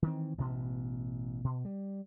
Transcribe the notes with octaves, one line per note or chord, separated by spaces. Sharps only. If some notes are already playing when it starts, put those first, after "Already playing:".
D#3 E3 C4
A1 B2
B2
G3